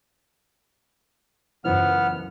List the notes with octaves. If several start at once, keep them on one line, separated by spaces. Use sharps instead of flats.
C#2 F#2 E3 B3 C5 F6